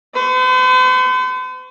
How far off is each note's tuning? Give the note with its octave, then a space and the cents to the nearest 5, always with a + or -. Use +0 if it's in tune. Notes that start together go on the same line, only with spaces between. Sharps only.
C5 -45 C#6 +0